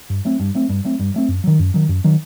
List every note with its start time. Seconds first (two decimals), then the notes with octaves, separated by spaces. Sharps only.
0.10 G2
0.25 F#3 A3 C4
0.40 G2
0.55 F#3 A3 C4
0.69 G2
0.85 F#3 A3 C4
1.00 G2
1.14 F#3 A3 C4
1.29 F#2
1.44 D#3 F#3
1.59 F#2
1.74 D#3 F#3
1.89 F#2
2.04 D#3 F#3